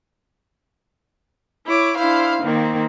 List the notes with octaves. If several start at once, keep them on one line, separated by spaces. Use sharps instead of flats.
E4 C#5 D6
D4 E4 C5 F5
D#3 A#3 C4